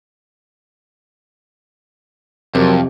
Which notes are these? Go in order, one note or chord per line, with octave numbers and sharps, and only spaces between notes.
F2 C3 F#3 A#4